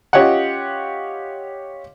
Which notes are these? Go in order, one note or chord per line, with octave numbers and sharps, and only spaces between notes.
C#4 F4 G4 C#5 D#5 F#5